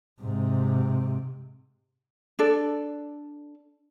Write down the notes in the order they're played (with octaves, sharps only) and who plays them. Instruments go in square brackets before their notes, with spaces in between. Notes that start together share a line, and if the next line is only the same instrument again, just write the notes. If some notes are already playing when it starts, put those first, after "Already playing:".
[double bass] G#2 C3
[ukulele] D4 A4 D5